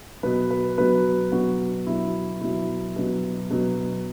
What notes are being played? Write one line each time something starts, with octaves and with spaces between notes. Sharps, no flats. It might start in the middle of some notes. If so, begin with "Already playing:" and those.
B2 F#3 B4
B4
B2 F#3 B4
B2 F#3 F#4
B2 F#3 E4
B2 F#3 E4
B2 F#3
B2 F#3